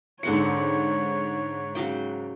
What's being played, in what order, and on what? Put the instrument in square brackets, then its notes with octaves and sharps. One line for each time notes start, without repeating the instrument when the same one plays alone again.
[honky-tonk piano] G#2 C#7 [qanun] D3 C4 F#5 [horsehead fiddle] C#5
[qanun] C#3 F#3 G5